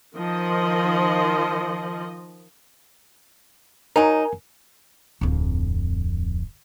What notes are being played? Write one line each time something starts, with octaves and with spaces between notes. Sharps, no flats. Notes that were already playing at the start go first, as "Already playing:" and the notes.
D#3 F3 D#5
F#3 D#4 A#4 G#5
D1 F2